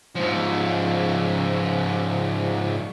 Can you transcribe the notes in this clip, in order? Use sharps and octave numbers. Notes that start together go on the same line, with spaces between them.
G#2 F3